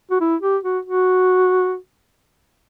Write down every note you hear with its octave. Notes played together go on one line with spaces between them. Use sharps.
F#4
E4
G4
F#4
F#4